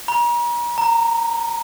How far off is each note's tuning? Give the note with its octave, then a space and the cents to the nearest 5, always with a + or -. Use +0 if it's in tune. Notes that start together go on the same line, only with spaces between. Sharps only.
A#5 +40
A#5 -15